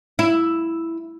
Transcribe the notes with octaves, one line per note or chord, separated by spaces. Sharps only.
E4